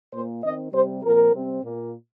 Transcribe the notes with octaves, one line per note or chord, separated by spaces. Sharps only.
A#2 A#3 C5
D#3 C4 D#5
C3 G3 C4 C5
A#2 F3 C4 A#4
C3 G3 C4
A#2 A#3